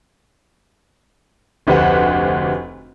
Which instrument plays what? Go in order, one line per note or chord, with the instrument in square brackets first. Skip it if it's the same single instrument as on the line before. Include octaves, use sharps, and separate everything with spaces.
[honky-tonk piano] F1 D2 G4 B4 C5 F#5